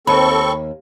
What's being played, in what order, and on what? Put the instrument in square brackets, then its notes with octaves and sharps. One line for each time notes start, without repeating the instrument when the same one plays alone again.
[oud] D#2 [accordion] C4 A4 C#6 [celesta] B5